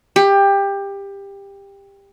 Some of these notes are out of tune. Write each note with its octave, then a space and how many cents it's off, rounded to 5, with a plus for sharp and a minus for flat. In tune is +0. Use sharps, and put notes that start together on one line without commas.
G4 +20